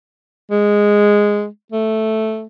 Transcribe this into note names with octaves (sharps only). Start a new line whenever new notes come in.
G#3
A3